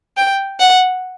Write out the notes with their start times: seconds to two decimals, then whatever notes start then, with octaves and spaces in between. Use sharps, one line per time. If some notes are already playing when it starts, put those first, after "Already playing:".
0.17 G5
0.60 F#5